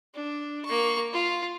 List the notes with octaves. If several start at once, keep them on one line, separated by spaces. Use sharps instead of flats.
D4
A#3 C#6
F4